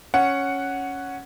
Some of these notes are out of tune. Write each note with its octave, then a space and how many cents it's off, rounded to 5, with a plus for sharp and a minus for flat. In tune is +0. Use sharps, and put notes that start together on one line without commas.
C#4 +0 F#5 +0